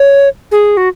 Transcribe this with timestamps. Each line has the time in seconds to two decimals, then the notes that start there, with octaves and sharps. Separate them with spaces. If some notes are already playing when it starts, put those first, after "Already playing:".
Already playing: C#5
0.51 G#4
0.77 F#4